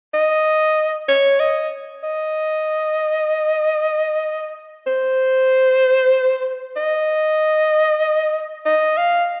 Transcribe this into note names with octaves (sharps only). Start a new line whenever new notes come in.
D#5
C#5
D#5
D#5
C5
D#5
D#5
F5